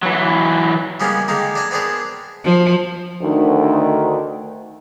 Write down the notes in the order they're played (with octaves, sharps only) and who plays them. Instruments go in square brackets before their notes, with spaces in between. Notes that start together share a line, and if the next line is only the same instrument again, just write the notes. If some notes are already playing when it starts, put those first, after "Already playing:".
[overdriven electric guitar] E3 F#3
[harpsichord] C#3 G3 G#3 A#3 B3 C#4
D3 D#3 G#3 A#3 G4
D4 D#5 G#5
B3 C4 D4 G#4 A#4
[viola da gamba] F3
[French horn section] D2 D#3